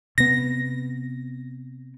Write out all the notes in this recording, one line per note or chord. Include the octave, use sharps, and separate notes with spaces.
C3 B3 A#6